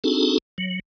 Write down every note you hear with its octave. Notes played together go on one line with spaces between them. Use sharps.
C4 D4 D#4 F#4 G#4 A4
F#3